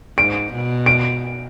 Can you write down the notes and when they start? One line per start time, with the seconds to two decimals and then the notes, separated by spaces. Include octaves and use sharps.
0.18 G#2 D7
0.52 B2
0.86 D7